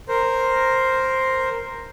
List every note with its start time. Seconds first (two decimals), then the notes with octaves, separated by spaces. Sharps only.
0.08 A#4 C5